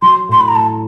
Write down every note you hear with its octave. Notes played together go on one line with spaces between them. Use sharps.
F#3 C6
A2 C6
B5
A#5
A2 A5